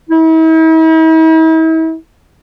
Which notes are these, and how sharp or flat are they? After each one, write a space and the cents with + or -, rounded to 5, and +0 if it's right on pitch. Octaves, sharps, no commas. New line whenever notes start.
E4 -45